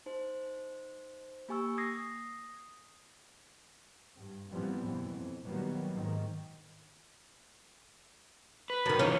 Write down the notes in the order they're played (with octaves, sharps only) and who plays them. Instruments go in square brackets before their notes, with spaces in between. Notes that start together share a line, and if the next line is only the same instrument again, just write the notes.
[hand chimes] D#4 C5
A#3 G4 G#5 C#6 E6
D#6 G#6 A#6 C7
[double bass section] G2
A#2 E3 F3 G3 B3 C4
F#2 B2 E3
F2
A#2 D#3 F#3 G3 A#3 B3
G#2 D#3
[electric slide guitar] B4
[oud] F#2 D#3
[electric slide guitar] E3 D4 F4 [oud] C#4